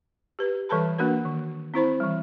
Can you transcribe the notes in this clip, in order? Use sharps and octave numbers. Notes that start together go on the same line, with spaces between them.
G4 B4
E3 G3 A4 B4 A5 B5
A#3 D4 F#4 A#4 B4
D#3
C4 E4 C5 B5
E3 G3